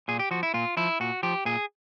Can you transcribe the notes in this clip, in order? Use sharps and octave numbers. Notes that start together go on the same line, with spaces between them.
A#2 G#4
G4
F3 F#4
E4
A#2 F4
F3 E4
A#2 F#4
F3 G4
A#2 G#4